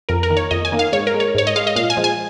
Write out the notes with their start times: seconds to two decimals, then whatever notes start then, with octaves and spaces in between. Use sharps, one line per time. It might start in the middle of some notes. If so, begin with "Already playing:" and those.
0.09 F2 A#4
0.23 A#4
0.30 D#3 A#3
0.37 C#5
0.51 F2 D#5
0.65 G#5
0.72 D#3 A#3
0.79 F5
0.92 G#2 C#5
1.07 A#4
1.14 G#3
1.20 C#5
1.35 G#2 C#5
1.47 D#5
1.56 G#3 F5
1.67 D#5
1.76 A#2 F5
1.90 G#5
1.97 F3 G#3
2.04 G#5